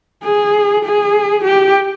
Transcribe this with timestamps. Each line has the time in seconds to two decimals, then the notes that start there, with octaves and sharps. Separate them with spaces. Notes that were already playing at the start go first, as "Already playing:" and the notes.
0.24 G#4
0.85 G#4
1.45 G4